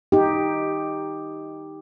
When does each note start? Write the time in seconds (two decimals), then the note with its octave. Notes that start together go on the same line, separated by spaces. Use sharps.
0.12 D#4 G4